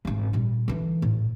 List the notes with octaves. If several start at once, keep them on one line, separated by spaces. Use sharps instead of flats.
G#1 D3
A#2 G3
D3 E3
A2